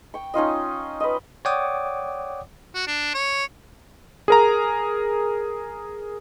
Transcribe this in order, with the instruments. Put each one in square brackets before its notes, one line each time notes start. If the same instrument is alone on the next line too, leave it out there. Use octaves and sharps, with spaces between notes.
[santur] G5 C#6
C#4 D#4 F4 D#5
B4 D#5
[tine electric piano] C#5 D5 F#5 G5 D6 D#6
[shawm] F#4
D4
C#5
[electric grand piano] G#4 A#4 A#5